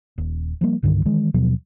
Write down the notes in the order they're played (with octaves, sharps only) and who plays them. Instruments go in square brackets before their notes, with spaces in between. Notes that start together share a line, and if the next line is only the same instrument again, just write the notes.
[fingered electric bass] D#1
F3 G3 A#3
C2 G2 D3 D#3
D#3 E3 G#3
D#2 B2 F3 F#3